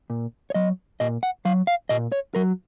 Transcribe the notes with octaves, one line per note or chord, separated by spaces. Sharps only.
A#2
C#5
F#3 D#5
A#2 D#5
F#5
F#3 F5
F5
A#2 D#5
C#5
F#3 A#4